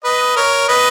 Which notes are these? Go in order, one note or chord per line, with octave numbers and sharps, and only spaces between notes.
B4 D#5
A#4 C#5
B4 D#5